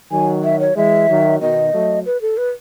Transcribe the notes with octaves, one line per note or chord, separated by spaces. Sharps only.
D#3 F#3 G#5
E5
C#5
E3 G#3 E5
D#3 F#3
B2 D#3 D#5
F#3 A3
B4
A4
B4